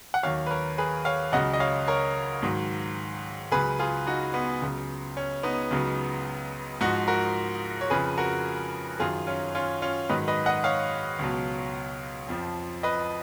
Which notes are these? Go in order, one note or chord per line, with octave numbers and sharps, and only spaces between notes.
F#5
D#2 D#3 F#3 C#5 F5
B4
A#4 C#5
G#4 B4
C#5 F5
C#2 C#3 F#3 D#5 F#5
D#5
C#5 F5
A#4 C#5
G#2 D#3 F#3
C#2 C#3 F#3 G#4 B4
F4 G#4
D#4 F#4
B3
C#2 C#3 F#3
C#4
B3 D#4
C#2 C#3 F#3
G#2 F3 D#4 F#4
F#4 A#4
C#5
F2 C#3 F3 G#4 B4
F#4 A#4
F#2 D#3 F#3 F4 G#4
C#4 F4
C#4 F4
C#4 F4
G#2 D#3 F#3 B4 D#5
B4 D#5
D#5 F#5
C#5 F5
C#2 B2 F#3
F2 F3
B4 D#5